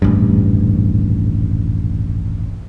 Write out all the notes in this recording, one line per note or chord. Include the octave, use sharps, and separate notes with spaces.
D#1 A1 G2